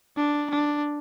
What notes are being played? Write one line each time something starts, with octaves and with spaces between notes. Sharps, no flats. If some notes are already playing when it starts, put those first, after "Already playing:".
D4
D4